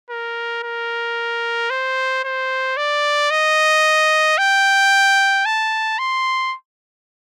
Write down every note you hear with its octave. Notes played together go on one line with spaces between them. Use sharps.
A#4
A#4
C5
C5
D5
D#5
G5
A5
C6